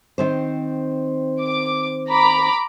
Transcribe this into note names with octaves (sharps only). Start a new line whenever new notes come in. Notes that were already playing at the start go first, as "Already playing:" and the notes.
D#3 C4 C5
D6
A#5 B5 D6